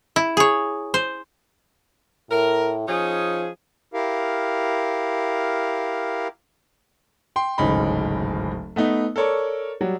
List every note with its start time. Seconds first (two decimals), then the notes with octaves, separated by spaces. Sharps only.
0.16 E4
0.37 G#4 C#5
0.94 C5
2.31 A2 A#4
2.88 F3 C#4 D#4 G#4
3.94 E4 G4 A#4 F5
7.36 G5 C6
7.58 D1 G#1 C#3 D#4 B5
8.76 A3 B3 D#4
9.16 A4 A#4 C#5 D5 C#6
9.81 F#3 G3